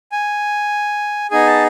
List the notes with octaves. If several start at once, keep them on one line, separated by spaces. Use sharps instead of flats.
G#5
B3 D#4 G#4 G#5
A5